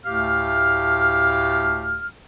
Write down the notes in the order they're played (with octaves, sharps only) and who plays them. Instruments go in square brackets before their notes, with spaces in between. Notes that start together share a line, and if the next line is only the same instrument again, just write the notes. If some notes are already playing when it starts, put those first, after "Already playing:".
[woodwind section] D2 A2 A3 G4 F5 F6